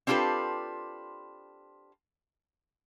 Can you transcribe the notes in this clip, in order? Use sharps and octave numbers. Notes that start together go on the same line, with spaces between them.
C4 D4 F4 G4 A4 B4